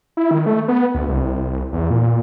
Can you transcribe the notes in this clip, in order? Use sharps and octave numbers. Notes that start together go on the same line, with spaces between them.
E4
D#3
A3
B3
D2
C2
E2
A#2